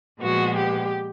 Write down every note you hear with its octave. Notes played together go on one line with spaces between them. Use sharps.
A#2 F3 G#3 B3 F#4
G4